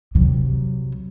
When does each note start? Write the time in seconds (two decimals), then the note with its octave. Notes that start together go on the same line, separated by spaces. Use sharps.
0.15 C3 F#3